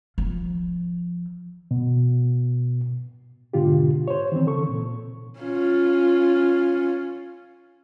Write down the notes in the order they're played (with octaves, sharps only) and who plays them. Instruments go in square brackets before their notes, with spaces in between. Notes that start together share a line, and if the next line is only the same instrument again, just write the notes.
[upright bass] F3
[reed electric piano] B2
G#2 B2 D3 F4 G4
C5 C#5
D#3 E3 C4
C#3 A4 C#6
A#2
[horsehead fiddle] C#4 F4